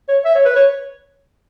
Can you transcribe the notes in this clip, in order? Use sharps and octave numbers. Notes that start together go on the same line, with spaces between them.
C#5
E5
C#5
B4
C#5